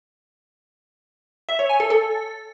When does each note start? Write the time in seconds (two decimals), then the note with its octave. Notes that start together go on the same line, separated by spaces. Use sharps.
1.49 E5
1.59 C#5
1.69 G#5
1.80 A4
1.90 A4